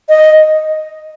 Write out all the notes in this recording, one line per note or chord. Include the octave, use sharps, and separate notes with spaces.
D#5